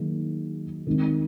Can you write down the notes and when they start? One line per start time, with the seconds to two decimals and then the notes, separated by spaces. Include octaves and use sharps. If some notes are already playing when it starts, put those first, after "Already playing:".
Already playing: D#3 F#3 A#3 D#4 G#4
0.87 D#3 G#3 C4